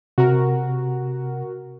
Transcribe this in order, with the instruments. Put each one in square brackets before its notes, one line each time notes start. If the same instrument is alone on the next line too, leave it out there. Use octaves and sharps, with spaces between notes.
[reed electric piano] C3 [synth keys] F#4 A#4